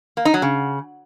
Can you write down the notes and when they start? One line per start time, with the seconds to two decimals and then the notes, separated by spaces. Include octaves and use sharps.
0.17 A#3
0.25 D#4
0.34 F#3
0.42 C#3